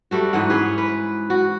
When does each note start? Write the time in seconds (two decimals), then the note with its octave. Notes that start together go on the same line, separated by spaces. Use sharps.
0.11 G3 A3 F#4
0.33 G#2 E3 F#5
0.50 C#4 G#4 B4
0.78 B4
1.30 F#4